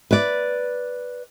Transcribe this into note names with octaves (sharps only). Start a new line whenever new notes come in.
B4 D5